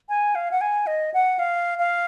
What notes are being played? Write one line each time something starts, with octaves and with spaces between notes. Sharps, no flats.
G#5
F5
F#5
G#5
D#5
F#5
F5
F5